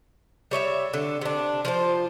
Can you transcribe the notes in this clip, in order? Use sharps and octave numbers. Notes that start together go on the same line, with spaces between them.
G3 C#5 D#5 E5
D3
C3 D4
F3 F4 C5